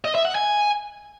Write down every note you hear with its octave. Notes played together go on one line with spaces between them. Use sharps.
D#5
E5
F#5
G#5